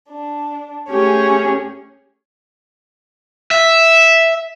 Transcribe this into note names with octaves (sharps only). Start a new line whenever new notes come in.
D4
A3 C#4 G4 G#4 C#5
E5